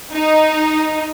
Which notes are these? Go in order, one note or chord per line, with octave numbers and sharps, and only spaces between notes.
D#4